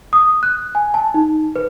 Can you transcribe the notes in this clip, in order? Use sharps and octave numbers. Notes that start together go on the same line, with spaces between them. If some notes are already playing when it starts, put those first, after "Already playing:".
D#6
F#6
G#5
A5
D#4
B4